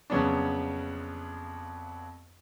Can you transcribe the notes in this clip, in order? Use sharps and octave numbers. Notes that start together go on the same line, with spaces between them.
F2 C#3 F#3 B3 D4